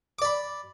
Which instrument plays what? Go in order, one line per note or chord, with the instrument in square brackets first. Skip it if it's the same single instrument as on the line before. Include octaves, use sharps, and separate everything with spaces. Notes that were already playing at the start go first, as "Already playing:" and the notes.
[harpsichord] D6
D5
B5